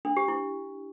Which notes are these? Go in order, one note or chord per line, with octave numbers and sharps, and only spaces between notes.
D4
G4
E4